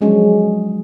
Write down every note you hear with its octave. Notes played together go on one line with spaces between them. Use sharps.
F3 F#3 G#3 C#4 D4